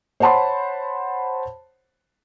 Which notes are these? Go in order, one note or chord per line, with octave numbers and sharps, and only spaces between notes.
C5 C#5 F#5 A5 B5 C6